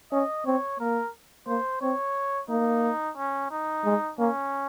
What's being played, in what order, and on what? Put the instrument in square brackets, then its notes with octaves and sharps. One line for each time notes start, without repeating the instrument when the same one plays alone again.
[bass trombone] C#4 [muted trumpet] D#5
[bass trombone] C4 [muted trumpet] C#5
[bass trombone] A#3 [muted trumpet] A#4
[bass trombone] A#3 [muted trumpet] C5
[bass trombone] C4 [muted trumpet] C#5
[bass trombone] A#3 [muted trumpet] D#4
[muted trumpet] C#4
D#4
[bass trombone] G#3
[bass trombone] A#3 [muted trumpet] C#4